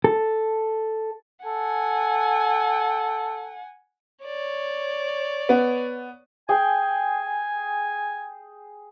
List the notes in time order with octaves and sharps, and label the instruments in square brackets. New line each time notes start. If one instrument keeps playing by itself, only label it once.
[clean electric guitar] A4
[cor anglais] A4 [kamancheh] F#5 G#5
[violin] C#5 D5
[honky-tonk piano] B3
[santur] G#4 G5 [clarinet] G#5